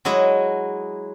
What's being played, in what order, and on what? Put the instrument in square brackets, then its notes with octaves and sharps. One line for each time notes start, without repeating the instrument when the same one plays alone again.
[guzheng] F#3 G#3 E4 D#5